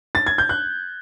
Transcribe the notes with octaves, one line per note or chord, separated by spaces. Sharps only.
A6
G#6
G6
F#6